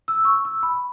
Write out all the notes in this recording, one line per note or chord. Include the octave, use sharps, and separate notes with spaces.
E6
C#6
E6
B5